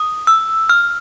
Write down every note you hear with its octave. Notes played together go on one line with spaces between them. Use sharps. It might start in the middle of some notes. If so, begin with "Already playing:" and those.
Already playing: D#6
E6
F6